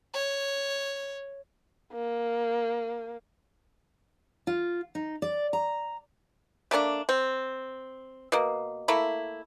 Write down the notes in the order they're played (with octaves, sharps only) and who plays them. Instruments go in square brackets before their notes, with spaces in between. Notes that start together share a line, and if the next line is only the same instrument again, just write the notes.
[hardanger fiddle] C#5
[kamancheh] A#3
[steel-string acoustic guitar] F4
D#4
D5
A#5
[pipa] A3 A#3 C#4 D4
C4
B2 A#3
A3 A#3 E4